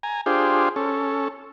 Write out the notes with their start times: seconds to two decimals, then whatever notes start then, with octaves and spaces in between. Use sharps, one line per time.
0.03 G#5 A#5
0.26 D4 F4 G4 G#4 C5
0.76 C#4 A4